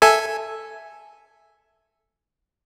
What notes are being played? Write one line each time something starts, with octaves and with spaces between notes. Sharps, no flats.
A4 E5 G#5